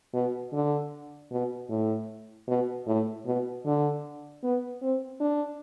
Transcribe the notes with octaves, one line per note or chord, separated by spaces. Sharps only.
B2
D3
B2
A2
B2
A2
B2
D3
B3
C4
D4